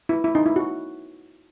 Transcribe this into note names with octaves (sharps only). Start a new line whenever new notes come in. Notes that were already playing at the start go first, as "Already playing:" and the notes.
E4
E4
D#4
E4
F#4